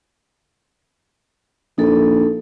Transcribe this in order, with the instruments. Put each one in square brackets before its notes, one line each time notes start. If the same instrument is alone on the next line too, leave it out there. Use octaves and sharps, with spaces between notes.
[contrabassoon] A#1 [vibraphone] D#4 A4